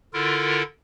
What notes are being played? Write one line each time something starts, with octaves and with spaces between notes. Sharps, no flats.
D3 E4 F4 A4 A#4